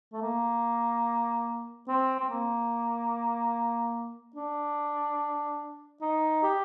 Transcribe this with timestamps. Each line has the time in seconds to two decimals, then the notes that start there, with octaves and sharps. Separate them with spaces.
0.12 A3
0.22 A#3
1.88 C4
2.20 C4
2.30 A#3
4.36 D4
6.01 D#4
6.43 G4